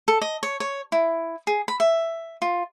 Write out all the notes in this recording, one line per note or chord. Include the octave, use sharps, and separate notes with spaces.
A4
D#5
C#5
C#5
E4
G#4
B5
E5
F4